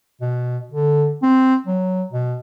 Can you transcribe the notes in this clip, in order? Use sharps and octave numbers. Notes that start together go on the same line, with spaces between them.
B2
D3
C4
F#3
B2